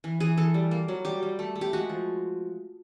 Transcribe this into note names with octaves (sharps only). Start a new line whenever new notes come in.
E3
E3 G#4
E3 A4
G3
A#3
F#3
G3 G4
G3
A3
A3
G4
G#3 F#4
F3